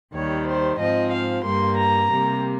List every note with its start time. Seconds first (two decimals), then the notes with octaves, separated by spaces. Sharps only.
0.13 D#2 D#3 G3 C#5
0.46 C5
0.78 G#2 F3 C4 D#5
1.12 F5
1.44 G2 G3 A#3 C6
1.77 A#5
2.10 C3 G3 A#3